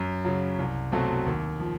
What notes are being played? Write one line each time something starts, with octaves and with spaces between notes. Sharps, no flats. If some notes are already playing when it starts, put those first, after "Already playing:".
Already playing: F#2
C#3 F#3
C2
B2 F#3 A3 C4
D#2
F3